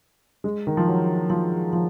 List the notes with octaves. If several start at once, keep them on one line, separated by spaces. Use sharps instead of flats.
G#3
D#3
F3
F#3
F3
F3